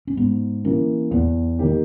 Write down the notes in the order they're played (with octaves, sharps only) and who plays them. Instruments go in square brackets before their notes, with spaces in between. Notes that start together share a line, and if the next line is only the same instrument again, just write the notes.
[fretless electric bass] C#4
[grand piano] G#2 [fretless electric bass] B3
[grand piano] E3 A#3 [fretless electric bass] C#4
[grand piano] E2 [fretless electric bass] B3
[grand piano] D#3 A#3 D#4 G4